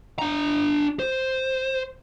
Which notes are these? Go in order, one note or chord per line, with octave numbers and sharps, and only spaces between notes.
D4 A#5
C5